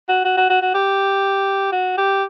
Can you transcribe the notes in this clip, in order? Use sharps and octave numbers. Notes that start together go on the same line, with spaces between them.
F#4
F#4
F#4
F#4
F#4
G4
F#4
G4